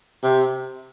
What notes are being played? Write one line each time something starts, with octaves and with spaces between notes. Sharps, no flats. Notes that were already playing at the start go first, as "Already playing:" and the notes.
C3